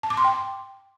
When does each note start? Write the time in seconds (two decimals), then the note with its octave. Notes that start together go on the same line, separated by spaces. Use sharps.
0.03 A5
0.10 D6
0.17 C6
0.24 G5